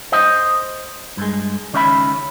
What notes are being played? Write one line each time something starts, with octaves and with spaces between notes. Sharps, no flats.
C5 D#5
G2 G#3
C#2 D#3 C#4 F#4 E5 B5